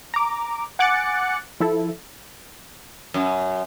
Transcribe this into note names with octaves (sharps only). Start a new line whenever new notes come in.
A#5 D6
F#5 G#5 D6 F#6 A6 C#7
F3 E4 A4
F#2